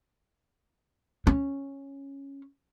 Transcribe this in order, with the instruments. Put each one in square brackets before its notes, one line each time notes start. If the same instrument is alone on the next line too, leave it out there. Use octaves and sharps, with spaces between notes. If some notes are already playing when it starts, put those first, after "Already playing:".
[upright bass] C#4